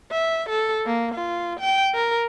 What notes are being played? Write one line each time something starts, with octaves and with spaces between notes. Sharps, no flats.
E5
A4
A#3
F4
G5
A#4